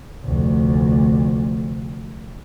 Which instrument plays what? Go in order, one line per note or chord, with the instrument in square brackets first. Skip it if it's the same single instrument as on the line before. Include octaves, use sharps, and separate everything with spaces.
[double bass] F1 D2